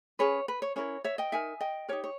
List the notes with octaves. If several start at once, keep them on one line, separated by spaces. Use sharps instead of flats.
C#4 G#4 B4 C#5
B4
C#5
C#4 E4 A#4 C#5
C#5 E5
D#5 G5
D#4 A#4 E5 G#5
D#5 G5
D#4 G4 A#4 C#5
C#5